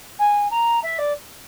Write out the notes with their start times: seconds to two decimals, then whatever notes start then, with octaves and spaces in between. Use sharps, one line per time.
0.19 G#5
0.51 A#5
0.83 E5
0.99 D5